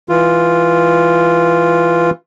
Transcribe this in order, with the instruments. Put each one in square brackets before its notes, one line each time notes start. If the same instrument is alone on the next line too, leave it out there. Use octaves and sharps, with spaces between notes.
[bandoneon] E3 F4